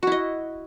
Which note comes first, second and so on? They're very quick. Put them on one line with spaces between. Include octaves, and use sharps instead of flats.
F#4 E4 D#5